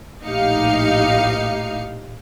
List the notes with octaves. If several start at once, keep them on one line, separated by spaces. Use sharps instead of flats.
A#1 A2 D#4 G4 F5 C#7